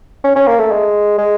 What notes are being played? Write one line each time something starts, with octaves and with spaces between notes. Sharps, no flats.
C#4
C#4
A#3
A3
G#3
G#3